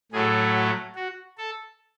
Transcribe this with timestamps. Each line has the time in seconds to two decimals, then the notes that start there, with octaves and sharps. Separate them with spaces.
0.12 A2 F#3 A3 G#4
0.55 F#4
0.95 F#4
1.38 A4